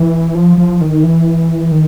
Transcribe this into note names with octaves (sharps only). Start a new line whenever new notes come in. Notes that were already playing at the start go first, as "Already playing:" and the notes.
Already playing: E3
F3
F3
D#3
E3
D#3